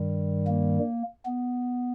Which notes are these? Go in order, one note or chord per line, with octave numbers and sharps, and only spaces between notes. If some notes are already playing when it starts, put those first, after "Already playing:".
Already playing: G2 D#3 G3
A#3
B3